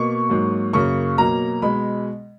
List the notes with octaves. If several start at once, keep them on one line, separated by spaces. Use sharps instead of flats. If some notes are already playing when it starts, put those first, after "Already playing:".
Already playing: B2 A#3 C#6
G#2 F#3 A#3
F#2 C#3 F#3 A#3 C#6
B2 F#3 A#3 A#5
B2 G#3 B5